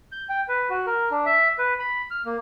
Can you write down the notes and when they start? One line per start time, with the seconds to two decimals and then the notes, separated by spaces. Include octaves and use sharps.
0.12 G6
0.29 G5
0.48 B4
0.70 F#4
0.87 A#4
1.11 D4
1.26 E5
1.59 B4
1.79 B5
2.11 F6
2.25 A#3